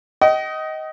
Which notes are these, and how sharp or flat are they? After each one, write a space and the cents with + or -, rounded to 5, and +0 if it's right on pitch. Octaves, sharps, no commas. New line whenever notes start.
D#5 +15 G5 -40